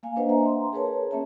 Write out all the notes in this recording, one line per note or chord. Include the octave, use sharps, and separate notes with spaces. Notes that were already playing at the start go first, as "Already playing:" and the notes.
A#3 F5 G#5
A#3 D4 B4 C5 D#5 F#5
E5 G#5 A#5
C6
G#4 A#4 B4 C#5 A5
A#3 C#4 E5 A5